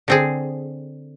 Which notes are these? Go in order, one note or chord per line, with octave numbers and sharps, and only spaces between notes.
D3 C4 G#4